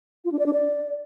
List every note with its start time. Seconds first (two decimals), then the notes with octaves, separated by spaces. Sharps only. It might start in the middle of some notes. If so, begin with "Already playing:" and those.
0.25 F4
0.32 D4
0.39 D5
0.46 D4
0.53 D5